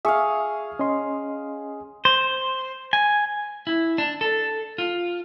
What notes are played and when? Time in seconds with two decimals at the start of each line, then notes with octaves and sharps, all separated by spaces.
0.05 G#4 E5 F5 C#6
0.79 C#4 D#5 C6
2.05 C5
2.93 G#5
3.67 E4
3.98 D4
4.21 A4
4.78 F4